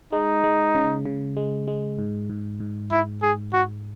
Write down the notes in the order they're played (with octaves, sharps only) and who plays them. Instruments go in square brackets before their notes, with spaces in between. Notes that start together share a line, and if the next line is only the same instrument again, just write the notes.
[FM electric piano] G#3 [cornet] D#4
[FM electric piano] G#3
C#3
C#3
G#3
G#3
G#2
G#2
G#2
[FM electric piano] G#2 [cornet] E4
[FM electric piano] G#2 [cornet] G#4
[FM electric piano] G#2 [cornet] F#4